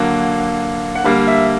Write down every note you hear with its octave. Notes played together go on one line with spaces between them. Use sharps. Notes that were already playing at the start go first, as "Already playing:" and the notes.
Already playing: D3 F#3 A#3 F#5
F#5
D3 G3 A#3 F5
E5